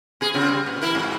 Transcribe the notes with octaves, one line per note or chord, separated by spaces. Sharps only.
B2 G#4
C#3 C4 F4
G3
A#2
E3 E4 A#4
F2 G#2